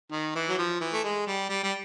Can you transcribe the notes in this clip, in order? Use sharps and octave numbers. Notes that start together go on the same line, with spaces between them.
D#3
E3
F#3
F3
E3
A3
G#3
G3
G3
G3